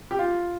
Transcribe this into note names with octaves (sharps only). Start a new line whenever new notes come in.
G4
F4